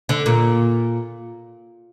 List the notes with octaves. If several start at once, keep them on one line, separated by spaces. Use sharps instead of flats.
D3
A#2